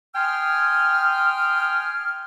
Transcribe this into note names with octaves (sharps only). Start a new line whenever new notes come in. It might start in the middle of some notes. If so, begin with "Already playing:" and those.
G5 G#5 C6 D#6 F6